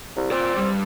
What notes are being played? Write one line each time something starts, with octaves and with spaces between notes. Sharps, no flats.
C2
C4 F4 D5
G2 G3